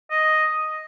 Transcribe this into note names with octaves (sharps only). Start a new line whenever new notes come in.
D#5